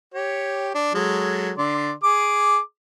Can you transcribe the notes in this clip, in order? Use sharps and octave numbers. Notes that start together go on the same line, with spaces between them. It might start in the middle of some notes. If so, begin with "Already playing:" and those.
G4 C#5
D4
F#3 G#3 A4
D3 D5 C6
G#4 D6